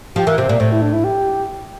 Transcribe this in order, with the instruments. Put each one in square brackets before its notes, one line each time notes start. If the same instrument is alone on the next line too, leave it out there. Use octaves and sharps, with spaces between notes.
[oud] F3 [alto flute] G4
[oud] E3 [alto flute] A#4
[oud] C3 [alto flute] C5
[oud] A#2 [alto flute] D5
[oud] A2 [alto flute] C5
[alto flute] E4
D4
E4
G4